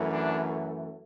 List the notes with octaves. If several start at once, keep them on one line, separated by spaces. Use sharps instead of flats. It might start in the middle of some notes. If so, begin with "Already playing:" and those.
Already playing: F#2 E3 A3
D4